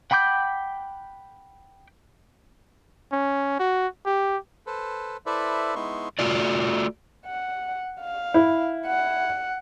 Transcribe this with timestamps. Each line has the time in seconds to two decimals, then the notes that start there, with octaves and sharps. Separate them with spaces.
0.11 F#5 G5 B5 D6 G6
3.12 C#4
3.59 F#4
4.06 G4
4.66 A4 B4 C5
5.26 E4 A4 B4 C5 D5 E5
5.75 G#3 B3 D#4 E4 C6 C#6
6.19 A3 F4 F#4 D5
7.26 F#5
8.01 F5
8.34 E4
8.86 F#5